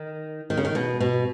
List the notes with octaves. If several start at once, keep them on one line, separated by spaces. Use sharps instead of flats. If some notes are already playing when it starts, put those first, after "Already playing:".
Already playing: D#3
D#3
C#3
D#3
B2
B2